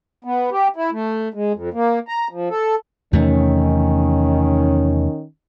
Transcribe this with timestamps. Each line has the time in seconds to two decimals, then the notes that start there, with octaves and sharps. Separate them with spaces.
0.24 B3
0.51 G4
0.76 E4
0.92 A3
1.34 G#3
1.54 F2
1.74 A#3
2.08 A#5
2.31 F3
2.50 A4
3.13 E2 C3 D#3 A3 C#4